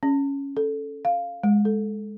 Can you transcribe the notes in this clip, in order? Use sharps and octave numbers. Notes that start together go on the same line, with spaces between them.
C#4
A4
F5
G#3
A4